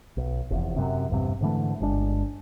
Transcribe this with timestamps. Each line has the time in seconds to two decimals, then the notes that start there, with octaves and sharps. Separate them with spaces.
0.17 B1
0.51 F1 E2
0.76 F#2 C3
1.10 A#1 E2 G2 C3
1.41 G#2 D3 E3 A3
1.80 G1 G#3 D4